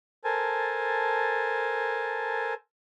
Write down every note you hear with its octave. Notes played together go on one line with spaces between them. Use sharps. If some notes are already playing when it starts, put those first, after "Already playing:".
A4 A#4 C5 G#5 A5